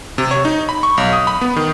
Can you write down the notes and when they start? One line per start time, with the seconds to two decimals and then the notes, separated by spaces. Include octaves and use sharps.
0.18 C3
0.31 C#5
0.45 D#4
0.69 B5
0.83 C#6
0.97 B1
1.13 D#6
1.27 B5
1.41 B3
1.56 D#3